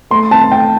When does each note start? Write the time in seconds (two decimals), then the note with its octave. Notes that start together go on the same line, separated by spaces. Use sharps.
0.11 A3 C6
0.31 C4 A5
0.51 A3 G5